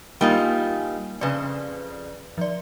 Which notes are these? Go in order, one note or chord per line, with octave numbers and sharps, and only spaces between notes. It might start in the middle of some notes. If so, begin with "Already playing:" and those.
G3 A#3 D#4 F4 A#4 G#5
F2 C#3 B4 D5
F3 D5